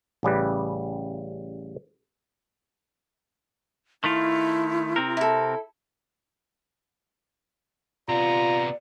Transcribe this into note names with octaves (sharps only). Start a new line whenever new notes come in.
A1 C#3 G3 B4
D#3 A3 E4 F4
C3 C4 A#4
E4 A4
C3 B3 F4 D5 A#5